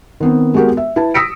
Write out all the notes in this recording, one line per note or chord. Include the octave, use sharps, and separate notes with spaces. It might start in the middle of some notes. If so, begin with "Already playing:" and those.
D#3 B3 C4
G#3 B3 F#4 G4 A#4
E5
E4 B4 A5
D#6 E6 A#6 B6 C#7 D7